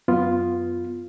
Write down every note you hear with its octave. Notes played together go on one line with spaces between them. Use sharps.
F#2 B3 F4